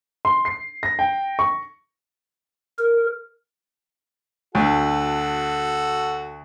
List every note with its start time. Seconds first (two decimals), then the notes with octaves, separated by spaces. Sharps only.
0.25 C6
0.45 C7
0.83 A#6
0.99 G5
1.39 C#6
2.79 A#4
4.55 D2 F#4 A4